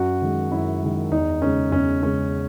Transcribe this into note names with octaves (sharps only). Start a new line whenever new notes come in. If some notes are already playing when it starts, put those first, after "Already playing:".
Already playing: F#2 F#4
D#3 G#3
F#2 E4
D#3 G#3
E2 D#4
C#3 G#3 C#4
E2 C#4
C#3 G#3 C#4